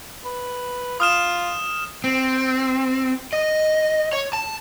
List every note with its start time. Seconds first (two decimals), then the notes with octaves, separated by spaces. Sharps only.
0.24 B4
1.00 F4 D#6 F6 E7
2.04 C4
3.33 D#5
4.13 C#5
4.33 A5